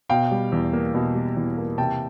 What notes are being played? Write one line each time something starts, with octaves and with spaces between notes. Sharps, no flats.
B2 F5 G5
G3
E2
A#3
B2
G3
E2
A#3
C3 G5 A5